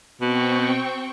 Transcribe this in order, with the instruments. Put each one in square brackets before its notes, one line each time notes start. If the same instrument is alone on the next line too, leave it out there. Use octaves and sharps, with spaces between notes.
[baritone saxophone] B2 [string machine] C4 G5 C#6